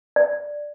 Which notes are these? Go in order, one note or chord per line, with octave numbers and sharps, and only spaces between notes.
D5